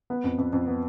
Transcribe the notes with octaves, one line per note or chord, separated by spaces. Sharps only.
B3
F2
F2
F2
B3